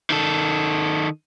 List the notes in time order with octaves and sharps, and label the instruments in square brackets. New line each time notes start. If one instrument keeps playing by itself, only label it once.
[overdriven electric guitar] D#3 A4